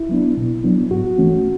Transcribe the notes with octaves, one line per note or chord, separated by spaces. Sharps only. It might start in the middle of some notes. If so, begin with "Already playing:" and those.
Already playing: E4
F#3 B3 D4
B2
F#3 B3 D4
G#2 F#4
E3 A3 C#4